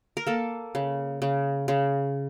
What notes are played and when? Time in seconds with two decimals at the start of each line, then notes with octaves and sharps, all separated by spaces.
0.17 A#4
0.27 A#3 A4
0.75 C#3
1.22 C#3
1.68 C#3